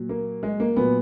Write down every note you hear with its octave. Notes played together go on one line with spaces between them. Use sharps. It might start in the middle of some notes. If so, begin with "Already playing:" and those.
Already playing: A#2 F#3
A#3
G#3
A#3
A#2 F#3 B3